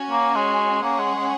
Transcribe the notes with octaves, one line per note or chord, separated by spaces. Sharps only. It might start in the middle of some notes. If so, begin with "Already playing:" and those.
Already playing: C#4 F#4 C#5 G#5
A#3
G#3
A#3 C#4 G#4 C#5 F#5
G#3
G#3